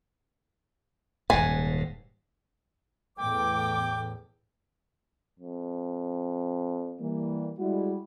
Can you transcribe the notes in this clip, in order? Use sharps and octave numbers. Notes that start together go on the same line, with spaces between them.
D#1 G#2 G#5
E2 A2 G5 D6
F2
E3 G3 A#3
G3 G#3 E4 F#4